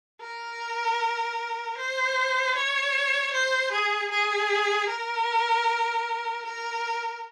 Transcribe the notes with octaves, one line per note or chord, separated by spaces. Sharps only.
A#4
C5
C#5
C5
G#4
G#4
A#4
A#4